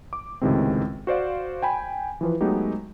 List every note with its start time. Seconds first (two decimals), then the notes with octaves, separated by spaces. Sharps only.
0.13 D6
0.41 C#2 A2 C3 D#3 G#3 C4
1.07 F#4 C5 D5 F5
1.63 G5 G#5 B5
2.21 E3 F3 B4
2.41 F#3 G#3 A3 B3 D#4 G4